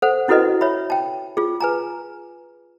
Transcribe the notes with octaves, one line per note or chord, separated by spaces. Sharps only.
A4 C5 F#5
C#4 E4 F#4 A4 B4 D#5
C#5 E5 B5
G5 A5
F4 G#4
B4 G#5 A#5